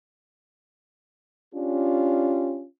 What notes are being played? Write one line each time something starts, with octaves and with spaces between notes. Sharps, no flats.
C#4 D4 F4 G4